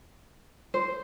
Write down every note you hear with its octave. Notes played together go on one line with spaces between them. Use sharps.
C5